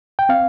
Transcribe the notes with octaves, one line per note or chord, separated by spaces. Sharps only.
G5
C4 F5